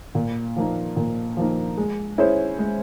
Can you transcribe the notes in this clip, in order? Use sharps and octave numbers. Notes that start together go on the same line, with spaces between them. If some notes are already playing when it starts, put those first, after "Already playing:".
A#2
F3 A#3 D#4
A#2
F3 A#3 D#4
G#3
C#4 E4 G#4 C5
G#3